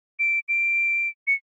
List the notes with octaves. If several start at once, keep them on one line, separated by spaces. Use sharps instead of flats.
D7
D7
C#7